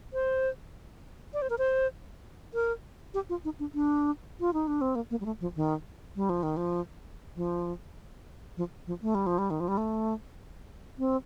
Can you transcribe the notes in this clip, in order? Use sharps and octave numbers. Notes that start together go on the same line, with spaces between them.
C5
D5
C5
A#4
C5
A#4
G4
F4
D#4
D4
D4
F4
D#4
D4
C4
A#3
A#3
G3
A3
F3
D#3
G3
F3
D#3
F3
F3
F3
F3
A3
G3
F3
G3
D#3
F3
G3
A3
C4